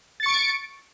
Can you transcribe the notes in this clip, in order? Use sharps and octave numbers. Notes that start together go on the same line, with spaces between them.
C#6 A6 C#7 D7